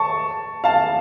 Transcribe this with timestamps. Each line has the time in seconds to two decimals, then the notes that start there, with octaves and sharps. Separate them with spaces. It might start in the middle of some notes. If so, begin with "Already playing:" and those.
Already playing: A5 C#6
0.64 F5 A5